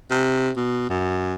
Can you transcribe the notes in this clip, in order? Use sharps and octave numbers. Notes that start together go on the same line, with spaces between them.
C3
B2
F#2